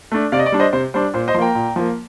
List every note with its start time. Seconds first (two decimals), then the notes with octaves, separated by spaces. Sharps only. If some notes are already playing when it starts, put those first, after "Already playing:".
0.12 A3 D4
0.32 C3 D5 F5
0.39 D#5
0.46 D5
0.52 G3 D4
0.60 C5 D#5
0.73 C3 C5
0.94 G3 D4 C5
1.14 A#2 C5
1.28 C5 D#5
1.35 F3 C6
1.39 A#3 G5 A#5
1.55 A#2
1.76 F3 A#3